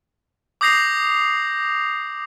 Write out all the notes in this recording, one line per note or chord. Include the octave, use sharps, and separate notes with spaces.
D6 D#6 G6 A#6 C7 F7